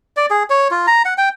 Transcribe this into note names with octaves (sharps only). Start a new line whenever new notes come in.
D5
G#4
C#5
F4
A#5
F#5
G5